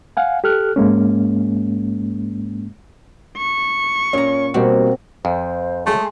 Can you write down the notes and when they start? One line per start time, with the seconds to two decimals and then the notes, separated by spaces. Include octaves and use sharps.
0.17 F5 F#5 G#5
0.44 G4 A4 F6 F#6
0.76 G#2 G#3 A#3 C#4
3.38 C#6
4.13 A#2 C#4 A#5
4.54 B2 G3 A#3 C4 F#4 G4
5.25 F2 C5
5.86 F#3 G#3 A3 G#4 C6